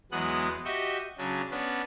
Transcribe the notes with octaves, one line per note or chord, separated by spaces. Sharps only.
E2 F#3 G#3 B3 D#6 F#6
F#4 G4 D#5 E5 C#6
C#3 F#3 C#4 D4
B3 C#4 D4 B4